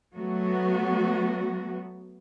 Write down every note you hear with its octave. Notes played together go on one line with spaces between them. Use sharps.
F#3 A3 B3 F#4